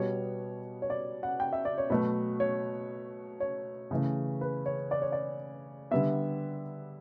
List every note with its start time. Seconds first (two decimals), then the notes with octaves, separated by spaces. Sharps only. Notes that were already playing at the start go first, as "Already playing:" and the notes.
Already playing: B2 G3 B3 C#5
0.82 C#5
0.90 D5
1.23 F#5
1.40 G5
1.53 E5
1.65 D5
1.78 C#5
1.90 B2 F#3 A3 B4
2.40 C#5
3.40 C#5
3.91 C#3 E3 A3
4.41 B4
4.66 C#5
4.91 D5
5.02 C#5
5.12 D5
5.91 D3 G3 B3 E5